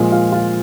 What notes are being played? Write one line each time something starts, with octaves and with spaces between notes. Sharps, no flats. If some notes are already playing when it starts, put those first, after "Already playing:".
Already playing: A#2 F3 G#3
F4 F5
F4 F5